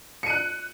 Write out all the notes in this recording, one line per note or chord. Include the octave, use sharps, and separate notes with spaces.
F#6 C#7 D#7